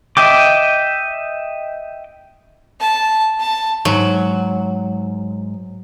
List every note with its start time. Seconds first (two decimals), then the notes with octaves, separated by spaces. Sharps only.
0.17 D#5 E5 G5 D6
2.80 A5
3.40 A5
3.85 G#2 F#3